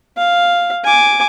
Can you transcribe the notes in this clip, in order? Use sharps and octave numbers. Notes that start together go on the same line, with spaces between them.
F5
G#5 D6